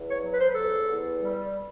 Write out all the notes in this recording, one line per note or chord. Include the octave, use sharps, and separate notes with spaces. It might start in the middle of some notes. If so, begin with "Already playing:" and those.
Already playing: E2
C#5
F#3
B4
C5
B4
E2 A4
E2
G3